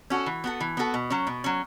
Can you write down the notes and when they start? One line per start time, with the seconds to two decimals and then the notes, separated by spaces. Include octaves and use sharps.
0.10 C#4 F#4 A4
0.26 E3
0.44 B3 F#4 A4
0.60 E3
0.77 B3 F#4 A4
0.94 B2
1.10 F#3 C#4
1.27 B2
1.44 F#3 C#4